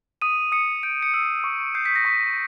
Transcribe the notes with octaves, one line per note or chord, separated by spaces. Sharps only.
D#6 D#7
D#6 C#7
G6 D7
C#7
E6 C7
C#6
G6 C7
B6
A#6
C#6 B6